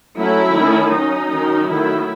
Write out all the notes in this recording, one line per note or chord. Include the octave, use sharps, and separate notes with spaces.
F#3 A3 C#4 E4
D#3 A3 C#4
F#3 C#4 D#4
D#3 F#3 C#4
D#3 F#3 A3 E4